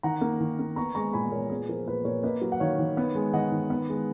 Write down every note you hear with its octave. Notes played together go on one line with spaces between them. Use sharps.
D#3 F#5 A#5
A#3
D#3
A#3
B3 A#5 C#6
G#3 A#5 C#6
A#2 G#5 B5
A#2 A#4 C#5
B3 G#4
F3 A#4
A#2 G#4 B4
A#2 A#4 C#5
A#3 B4 D#5
F#3
F#5
D#3 C#5 F5
D#3
B3
G#3
D#3 D#5 F#5
D#3
B3
G#3